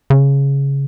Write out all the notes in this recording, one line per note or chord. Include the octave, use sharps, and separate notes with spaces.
C#3